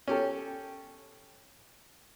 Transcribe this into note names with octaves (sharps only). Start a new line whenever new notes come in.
C#4 G4 A4